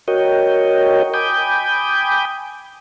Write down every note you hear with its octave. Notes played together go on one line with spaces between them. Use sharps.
F#4 A#4 C#5 D#5 G5
G5 G#5 B5 D6 D#6 G6